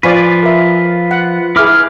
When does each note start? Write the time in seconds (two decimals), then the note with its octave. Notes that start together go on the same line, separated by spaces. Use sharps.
0.03 F3 F4 B4 D5 G#5 C#6
0.43 A#4 E5
1.11 F#5
1.56 E4 G#4 B4 D6 F6